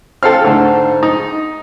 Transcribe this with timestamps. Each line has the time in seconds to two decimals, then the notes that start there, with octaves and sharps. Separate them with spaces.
0.23 C4 A4 F5 F6
0.44 G#2 D3 A3
1.03 D#4